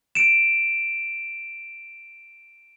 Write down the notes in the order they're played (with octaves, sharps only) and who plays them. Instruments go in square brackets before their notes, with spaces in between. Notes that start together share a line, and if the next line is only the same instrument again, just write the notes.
[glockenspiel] D7 E7